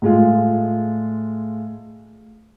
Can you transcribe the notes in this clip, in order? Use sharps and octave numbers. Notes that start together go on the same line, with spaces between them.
A2 G#3 F4